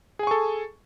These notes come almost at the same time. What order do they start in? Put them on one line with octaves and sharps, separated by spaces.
G#4 G#5 C#6 A4